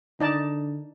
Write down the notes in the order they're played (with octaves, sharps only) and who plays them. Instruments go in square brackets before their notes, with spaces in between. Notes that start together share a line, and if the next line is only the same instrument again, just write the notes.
[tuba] D3 [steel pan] D#4 D5 A5